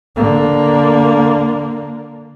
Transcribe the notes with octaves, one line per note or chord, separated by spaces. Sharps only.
D3 A#3